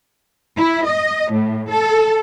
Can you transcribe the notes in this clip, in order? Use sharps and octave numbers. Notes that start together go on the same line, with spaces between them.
E4
D#5
A2
A4